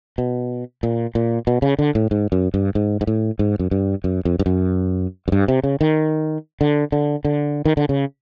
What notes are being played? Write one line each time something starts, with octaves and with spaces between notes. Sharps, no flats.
B2
A#2
A#2
B2
C#3
D3
A2
G#2
F#2
G2
G#2
G#2
A2
G#2
F#2
G2
F#2
F2
G2
F#2
F#2
G2
C3
C#3
D#3
D3
D3
D3
D#3
D3
C#3